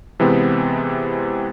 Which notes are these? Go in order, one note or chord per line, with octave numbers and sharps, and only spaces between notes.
C3 E3 G#3 B3 C4